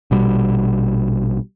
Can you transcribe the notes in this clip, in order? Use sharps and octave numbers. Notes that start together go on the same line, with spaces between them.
A#1 B2 G3